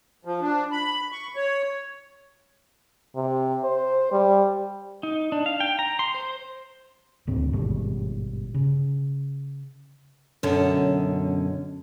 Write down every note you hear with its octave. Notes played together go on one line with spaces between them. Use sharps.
F3
D4
B5
C#6
C#5
C3
C5
G3
D#4
D4
F5
G5
A#5
C6
C5
D#1 D2 G#2 C4
G#1 G2 B2
C#3
F#2 B2 D3 C#4